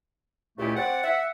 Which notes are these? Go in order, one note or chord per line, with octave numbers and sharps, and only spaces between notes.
C#2 A#2 A3 E4 G4
C4 D5 F#5
E5 F#5